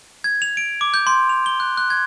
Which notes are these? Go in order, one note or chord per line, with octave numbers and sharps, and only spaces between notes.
G#6
F7
D7
D6
G6
C6
F7
G7
F#6
F#6
G#6